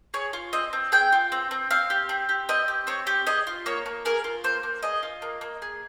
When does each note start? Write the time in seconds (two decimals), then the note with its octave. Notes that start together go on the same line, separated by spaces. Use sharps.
0.14 G#4 C#5
0.33 F4
0.53 C4 D#5
0.73 C4
0.92 G#4 G5
1.12 F4
1.32 C4
1.51 C4
1.71 C4 F5
1.90 G4
2.09 C4
2.29 G4
2.49 C4 D#5
2.68 G4
2.87 C4 C#5
3.07 G4
3.27 G#4 D#5
3.47 F4
3.66 A#3 C#5
3.86 A#3
4.05 G#4 A#4
4.24 F4
4.44 A#3 C5
4.63 A#3
4.83 G#4 D#5
5.03 F4
5.22 A#3
5.41 A#3
5.62 G#4